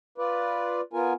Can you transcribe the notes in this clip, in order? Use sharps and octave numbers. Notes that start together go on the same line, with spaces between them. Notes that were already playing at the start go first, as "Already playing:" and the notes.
F4 B4 D5
B3 F4 A#4 G#5